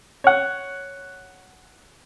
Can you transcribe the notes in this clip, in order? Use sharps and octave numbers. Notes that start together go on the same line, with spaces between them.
C#5 F#5